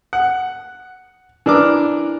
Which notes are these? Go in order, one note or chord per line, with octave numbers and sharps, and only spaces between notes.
F#5
E3 D4 A#4 D6